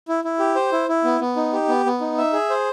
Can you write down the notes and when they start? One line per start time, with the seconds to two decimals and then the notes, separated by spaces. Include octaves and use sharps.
0.08 E4
0.24 E4
0.39 G4
0.56 C5
0.72 E4
0.89 E4
1.04 B3
1.21 B3
1.36 D#4
1.53 G4
1.69 B3
1.86 B3
2.01 D#4
2.18 E5
2.33 G#4
2.50 C5